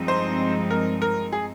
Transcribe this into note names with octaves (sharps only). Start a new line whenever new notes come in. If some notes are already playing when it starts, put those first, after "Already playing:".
Already playing: G2 F3 G#3 C4 D#4
C5
A#4
A#4
G#4